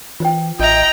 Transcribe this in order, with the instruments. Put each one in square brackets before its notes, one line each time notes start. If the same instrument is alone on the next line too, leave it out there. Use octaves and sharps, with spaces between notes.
[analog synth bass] E3 [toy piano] F4 C5 G5
[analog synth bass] A1 [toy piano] F4 E5 [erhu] D#5 [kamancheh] G5 A#5